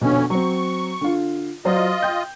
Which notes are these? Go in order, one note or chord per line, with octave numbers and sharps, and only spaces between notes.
F2 B2 D3 C#4
F#3 C4 C#6
D3 F4
F#3 F4 C5 D5 D#5
G5 G6